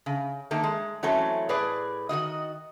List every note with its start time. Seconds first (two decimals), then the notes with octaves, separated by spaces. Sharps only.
0.06 C#3
0.51 D#3 A3 A#3
0.64 G#3
1.03 E3 F#3 A3 C4 C#4
1.49 A2 G#4 B4 D5
2.09 D#3 F3 F#4 D#5